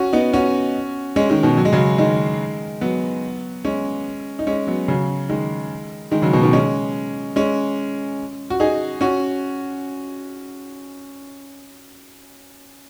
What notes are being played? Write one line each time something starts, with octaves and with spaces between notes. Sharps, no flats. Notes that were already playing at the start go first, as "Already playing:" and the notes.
Already playing: C#4 F#4
B3 D#4
C#4 F#4
G#3 C#4
D#3 G#3
B2 D#3
F#3
G#3
C#3 F#3
D#3 G#3
F#3 B3
G#3 C#4
D#4
G#3 C#4
F#3 B3
C#3 F#3
D#3 G#3
D#3 G#3
C#3 F#3
B2 D#3
B2 D#3
G#3 C#4
G#3 C#4
F#4
D#4 G#4
C#4 F#4